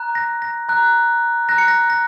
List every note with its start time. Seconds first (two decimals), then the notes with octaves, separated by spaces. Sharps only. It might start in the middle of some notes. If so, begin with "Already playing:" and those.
Already playing: A#5 F#6
0.15 A#6
0.42 A#6
0.69 A#5 F#6
1.49 A#5 F#6 A#6
1.58 C#7
1.68 A#6
1.90 A#6